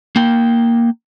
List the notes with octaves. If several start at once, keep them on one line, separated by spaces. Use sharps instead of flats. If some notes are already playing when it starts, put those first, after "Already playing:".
A#3 G5